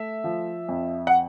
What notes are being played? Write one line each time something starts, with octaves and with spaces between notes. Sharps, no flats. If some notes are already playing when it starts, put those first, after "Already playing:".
Already playing: A3 E5
F3
F2
F#5